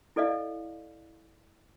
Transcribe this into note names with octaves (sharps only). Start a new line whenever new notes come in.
E4 A4 D5 D#5 F5